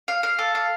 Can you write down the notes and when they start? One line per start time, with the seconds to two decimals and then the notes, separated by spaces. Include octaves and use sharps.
0.08 F5
0.23 F5
0.39 A4
0.55 F5